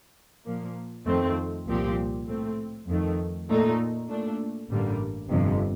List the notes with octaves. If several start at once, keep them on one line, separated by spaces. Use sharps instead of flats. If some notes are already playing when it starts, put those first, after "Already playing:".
A#2 F3 A#3
F2 D#3 A3 C4
C2 A#2 F3 C4 G4
A2 A3 C4
F2 D#3 A3
A#2 A3 D#4
A#2 A3 D4
A1 G2 D3 G3 A#3
G1 F2 C3